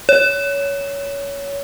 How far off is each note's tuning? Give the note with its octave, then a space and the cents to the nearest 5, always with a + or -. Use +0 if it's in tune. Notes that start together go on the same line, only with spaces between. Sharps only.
C#5 +20